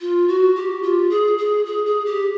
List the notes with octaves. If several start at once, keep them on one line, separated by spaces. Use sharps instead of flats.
F4
F#4
G4
F4
G#4
G#4
G#4
G#4
G4